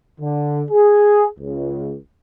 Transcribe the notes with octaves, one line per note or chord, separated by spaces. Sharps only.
D3
G#4
C#2